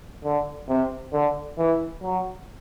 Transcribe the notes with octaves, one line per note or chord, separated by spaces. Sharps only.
D3
C3
D3
E3
F#3